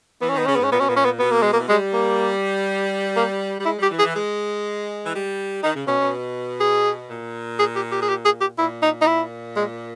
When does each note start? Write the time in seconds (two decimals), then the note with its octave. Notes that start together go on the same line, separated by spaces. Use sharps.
0.21 E3 B3
0.29 C#4
0.34 D#3 B3
0.46 C#3 C#4
0.56 G#2 B3
0.64 C#4
0.71 A#2 B3
0.79 B2 C#4
0.89 A#2 B3
0.97 C#4
1.05 B3
1.19 B2 B3
1.31 A#3
1.43 G#3
1.53 A#3
1.59 E3
1.69 G3 G#3
1.93 A#3
3.17 A#3
3.58 G3
3.65 G#3 E4
3.78 G3 G4
3.91 E3
3.99 G#4
4.03 E3
4.15 G#3
5.04 E3
5.14 G3
5.63 D#3 D#4
5.75 C#3
5.87 B2 C#4
5.99 B2
6.60 G#4
7.10 A#2
7.59 G#4
7.76 G4
7.92 G4
8.02 G#4
8.09 G4
8.25 G#4
8.41 G4
8.58 A#2 E4
8.82 D#4
9.01 D#4
9.07 E4
9.56 G#3